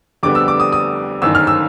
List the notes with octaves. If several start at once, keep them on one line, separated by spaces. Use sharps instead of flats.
F2 D3 G3 B3 D6
E6
D6
D#6
D#6
G1 F#2 D#3 E6
F6
E6